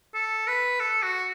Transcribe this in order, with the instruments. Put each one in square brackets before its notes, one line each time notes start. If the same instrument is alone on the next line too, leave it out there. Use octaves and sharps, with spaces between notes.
[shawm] A4
B4
A4
F#4